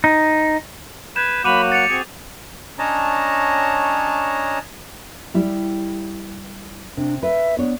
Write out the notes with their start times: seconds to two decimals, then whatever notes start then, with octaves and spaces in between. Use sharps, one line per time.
0.04 D#4
1.16 B4 G6 G#6 E7
1.44 F#3 A#3 F#4 F#5 B5 D6 D#7 F7
1.72 A6 C#7 F7
1.90 C4 F#4 G#4
2.79 C#4 D4 C#5 D#5 A5 A#5
5.34 G3 E4 G4
6.97 C3 D4
7.23 B4 E5
7.58 B3 D4 C#5